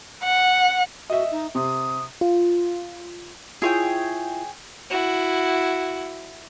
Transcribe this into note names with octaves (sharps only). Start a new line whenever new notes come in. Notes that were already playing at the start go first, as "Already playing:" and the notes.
F#5
F#4 D#5 E5
D#4
C3 D#6
F4
E4 F4 G#4 C#5 G5
E4 F#4